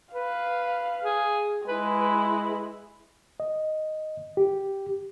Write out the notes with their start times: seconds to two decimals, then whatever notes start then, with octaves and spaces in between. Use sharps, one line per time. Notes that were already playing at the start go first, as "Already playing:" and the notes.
0.14 B4 F5
1.04 G#4
1.68 G#3 E4 B4
1.96 B4
3.40 D#5
4.37 G4